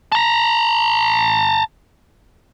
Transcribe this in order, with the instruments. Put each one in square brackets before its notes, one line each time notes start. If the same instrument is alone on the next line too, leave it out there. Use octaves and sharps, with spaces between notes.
[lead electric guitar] A5 A#5